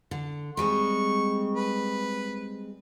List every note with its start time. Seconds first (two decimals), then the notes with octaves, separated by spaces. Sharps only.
0.11 D3
0.57 G3 G#3 C4 C#6
1.55 B4